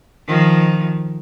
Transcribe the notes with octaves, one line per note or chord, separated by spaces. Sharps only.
D#3 F3